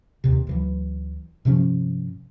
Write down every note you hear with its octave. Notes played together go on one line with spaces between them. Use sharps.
D#2 C3
D2 E3 F#3
G2 C3 F3 C#4